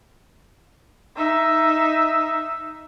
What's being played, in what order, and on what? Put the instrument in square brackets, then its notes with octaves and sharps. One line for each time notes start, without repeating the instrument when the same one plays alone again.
[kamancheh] D#4 E5